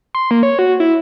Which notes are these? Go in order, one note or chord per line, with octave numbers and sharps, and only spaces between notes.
C6
A#3
C#5
F#4
E4